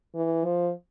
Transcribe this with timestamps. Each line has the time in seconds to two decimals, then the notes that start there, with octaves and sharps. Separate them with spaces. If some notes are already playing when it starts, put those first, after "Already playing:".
0.15 E3
0.44 F3